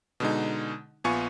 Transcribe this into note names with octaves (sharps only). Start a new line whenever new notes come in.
B2 D3 G#3 D#4
A#1 B3 F4 G#5 C#6 C#7